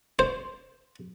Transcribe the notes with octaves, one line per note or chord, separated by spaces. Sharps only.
C5